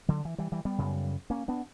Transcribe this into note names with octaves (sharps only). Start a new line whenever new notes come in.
D3 F#3
E3
E3 G3
E3 G3
G3 B3
F#2 C#3
A#3 C#4
B3 D4